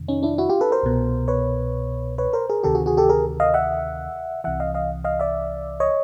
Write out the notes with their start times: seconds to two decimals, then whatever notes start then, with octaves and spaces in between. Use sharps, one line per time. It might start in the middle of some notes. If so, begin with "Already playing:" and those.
Already playing: F2 C3 D#3
0.08 C#4 D#4
0.23 D4 E4
0.38 E4 F#4
0.49 F4 G4
0.61 A4 B4
0.72 A#4 C5
0.83 C2 B2
1.28 B4 C#5
2.18 B4 C#5
2.33 A#4 C5
2.50 G#4 A#4
2.63 D2 C3 D#3 G4 A4
2.75 F#4 G#4
2.86 F#4 G#4
2.97 G4 A4
3.09 G#4 A#4
3.40 D#5 F5
3.54 E5 F#5
4.44 C2 C3 E3 E5 F#5
4.60 D#5 F5
4.74 D#5 F5
5.04 D#5 F5
5.20 D5 E5
5.80 C#5 D#5